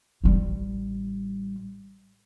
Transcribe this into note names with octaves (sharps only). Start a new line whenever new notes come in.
A1 G3